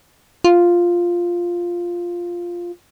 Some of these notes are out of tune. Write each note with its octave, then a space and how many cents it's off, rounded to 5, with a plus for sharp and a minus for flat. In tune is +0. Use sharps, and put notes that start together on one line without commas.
F4 +0